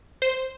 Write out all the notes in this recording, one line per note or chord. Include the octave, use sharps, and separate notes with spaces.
C5